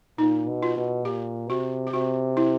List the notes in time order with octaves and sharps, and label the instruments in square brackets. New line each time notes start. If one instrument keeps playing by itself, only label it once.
[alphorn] A#2 [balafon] D#4
[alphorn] B2
[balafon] F4
[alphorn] B2
[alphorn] A#2 [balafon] G4
[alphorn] C3 [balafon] F#4
[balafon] G4
[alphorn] C3 [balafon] F#4
[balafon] E4